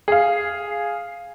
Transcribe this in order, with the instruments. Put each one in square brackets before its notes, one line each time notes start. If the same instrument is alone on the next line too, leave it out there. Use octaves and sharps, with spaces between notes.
[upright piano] G#4 F5